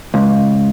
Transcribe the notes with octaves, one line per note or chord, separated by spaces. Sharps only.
C#2